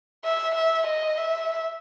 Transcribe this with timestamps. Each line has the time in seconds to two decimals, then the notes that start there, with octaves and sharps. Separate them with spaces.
0.24 E5
0.55 E5
0.86 D#5
1.17 E5